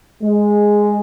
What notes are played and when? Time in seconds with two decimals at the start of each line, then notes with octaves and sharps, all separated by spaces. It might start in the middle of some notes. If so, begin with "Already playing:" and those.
0.23 G#3